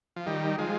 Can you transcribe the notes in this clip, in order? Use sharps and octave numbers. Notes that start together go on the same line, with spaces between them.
F3
D#3 G3
F3 G#3